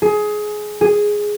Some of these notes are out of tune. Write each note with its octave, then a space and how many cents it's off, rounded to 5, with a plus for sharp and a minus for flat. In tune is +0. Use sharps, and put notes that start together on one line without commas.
G#4 +20
G#4 +0